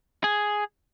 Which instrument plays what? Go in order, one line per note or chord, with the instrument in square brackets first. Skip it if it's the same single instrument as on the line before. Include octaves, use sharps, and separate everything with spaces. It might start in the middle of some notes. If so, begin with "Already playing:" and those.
[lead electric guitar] G#4